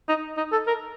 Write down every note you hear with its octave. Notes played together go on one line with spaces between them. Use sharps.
D#4
D#4
A4
A#4